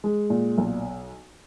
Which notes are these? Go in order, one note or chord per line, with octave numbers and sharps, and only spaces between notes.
G#3
A#2
B1